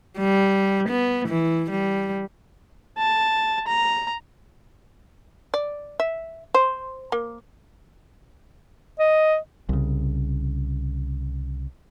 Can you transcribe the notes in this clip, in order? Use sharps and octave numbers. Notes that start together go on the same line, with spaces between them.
G3
B3
E3
G3
A5
A#5
D5
E5
C5
A#3
D#5
C2 C#3